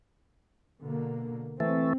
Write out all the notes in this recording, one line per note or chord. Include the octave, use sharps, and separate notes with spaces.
B2 D3 A#3
E3 A3 C4